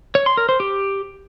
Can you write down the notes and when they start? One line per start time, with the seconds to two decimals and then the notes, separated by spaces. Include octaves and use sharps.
0.15 C#5
0.26 C6
0.37 A#4
0.49 C5
0.60 G4